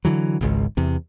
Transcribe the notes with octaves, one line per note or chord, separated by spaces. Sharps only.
D3 E3 F#3
G#1 C#2 G#2
E2 C3